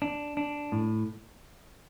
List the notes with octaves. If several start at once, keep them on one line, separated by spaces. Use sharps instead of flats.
D4
D4
A2